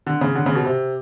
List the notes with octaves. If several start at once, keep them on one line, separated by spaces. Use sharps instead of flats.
D3
C#3
D3
C#3
B2
C3